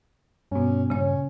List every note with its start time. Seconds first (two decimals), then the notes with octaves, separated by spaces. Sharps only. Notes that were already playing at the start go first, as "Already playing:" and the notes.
0.51 G2 B2 C#4
0.90 G2 A#2 C#3 C#4 C#5